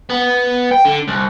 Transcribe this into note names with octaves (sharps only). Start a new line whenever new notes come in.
B3
G5
D3
C2